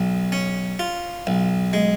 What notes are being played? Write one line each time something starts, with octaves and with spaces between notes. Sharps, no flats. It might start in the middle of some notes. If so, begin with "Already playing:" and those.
Already playing: B1
C#4
F4
B1
G#3